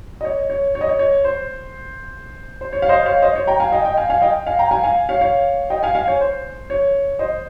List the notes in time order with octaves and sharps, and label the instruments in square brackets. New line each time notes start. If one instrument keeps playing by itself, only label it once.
[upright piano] D#5
C#5
C#5
C#5
D#5
C#5
C#5
C5
C5
C#5
F5
C5 D#5
C#5 F5
C5 D#5
C#5
G5 A#5
F5 G#5
D#5 G5
D#5 G5
F5 G#5
F5 G#5
D#5 G5
F5 G#5
G5 A#5
F5 G#5
F5 G#5
C#5 F5
C#5 F5
D#5 G5
F5 G#5
F5 G#5
C#5
C5
C#5
C5 D#5